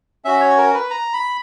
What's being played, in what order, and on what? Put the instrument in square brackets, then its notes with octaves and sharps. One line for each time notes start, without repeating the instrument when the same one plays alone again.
[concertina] C#4 F#4 E5
C#5
A#4
B4
A#5
B5